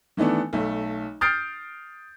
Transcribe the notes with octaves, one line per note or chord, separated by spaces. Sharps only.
D#3 E3 A3 B3 D4
B1 A3
D#6 F6 G6 A6 C7 D7